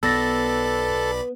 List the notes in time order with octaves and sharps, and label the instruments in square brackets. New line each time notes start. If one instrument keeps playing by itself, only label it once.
[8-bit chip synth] B1 D5 B5 [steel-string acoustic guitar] B3 [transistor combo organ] A4 [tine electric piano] E6 A6 A#6